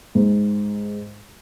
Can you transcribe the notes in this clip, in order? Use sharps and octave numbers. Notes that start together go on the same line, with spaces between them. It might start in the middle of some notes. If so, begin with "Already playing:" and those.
G#2